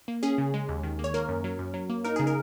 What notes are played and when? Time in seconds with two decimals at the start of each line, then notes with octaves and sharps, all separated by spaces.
0.08 A#3
0.23 C#4 G#4
0.38 C#3
0.54 G#3
0.69 D#2
0.83 D#3
0.99 A#3
1.04 C#5
1.14 A#3 A#4
1.29 F#2
1.44 F#3
1.59 F#2
1.74 F#3
1.90 A#3
2.04 D#4 A#4
2.16 C#3 G#4
2.27 A#4